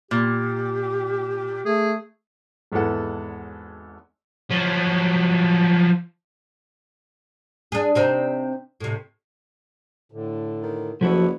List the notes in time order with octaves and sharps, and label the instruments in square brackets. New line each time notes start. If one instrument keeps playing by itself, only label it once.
[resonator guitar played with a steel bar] A#2 [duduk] G4
[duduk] A3 [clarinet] G#4
[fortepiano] G#1 E2 G#3 B3 A4 F#5
[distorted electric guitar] F3 F#3
[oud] D4 G#4
C3 C4 D#4
A2 C3
[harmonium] A2 D3
[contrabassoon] D#3
[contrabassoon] F#1 [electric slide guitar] F3 E4 F#4 [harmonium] B3 A4 F#5